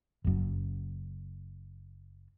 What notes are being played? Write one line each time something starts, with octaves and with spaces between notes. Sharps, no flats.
F#1 F#2